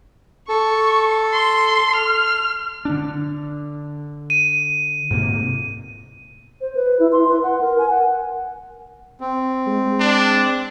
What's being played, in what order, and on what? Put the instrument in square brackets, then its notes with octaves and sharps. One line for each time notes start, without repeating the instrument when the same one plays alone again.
[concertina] A4 [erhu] C#6
[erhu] C6
F6
[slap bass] D3 D4
[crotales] D#7
[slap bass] G#2 C3 A#3
[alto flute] C5
B4
E4
C6
B4
F#5
A#4
G#5
F#5
[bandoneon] C4
[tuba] G#3
[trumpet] D4